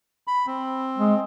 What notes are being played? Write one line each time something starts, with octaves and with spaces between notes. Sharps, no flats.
B5
C4
G#3